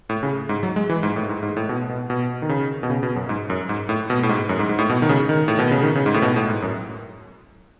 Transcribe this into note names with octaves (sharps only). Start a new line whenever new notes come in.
A2
C#3
G#2
F#3
G#3
E3
G#2
A2
G#2
G#2
A2
B2
B2
B2
D#3
C#3
B2
C#3
B2
F#2
G#2
F#2
G#2
A2
B2
A2
G#2
F#2
G#2
G#2
A2
B2
D#3
C#3
D#3
A2
B2
C#3
D#3
C#3
G#2
A2
B2
A2
G#2
F#2